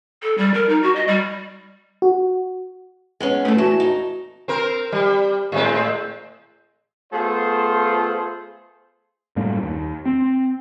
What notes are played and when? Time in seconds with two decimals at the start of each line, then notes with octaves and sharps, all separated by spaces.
0.23 A4
0.38 G3
0.54 A#4
0.69 D#4
0.82 F#4
0.96 D#5
1.08 G3
2.02 F#4
3.20 G#3 B3 C#4
3.45 A3 G#4 A4
3.58 E2 F#4 A5
3.80 D#4
4.48 C4 A#4
4.92 G3
5.52 A2 G#3 C4
7.12 A3 B3 F4 G#4 C5
9.36 F#2 A2 G3 A#3
9.63 D#2
10.05 C4